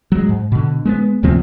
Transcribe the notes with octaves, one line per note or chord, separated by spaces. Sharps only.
F#3 G#3
G#2
B2 D3
G#3 A#3 B3
D2 C3 F3 C4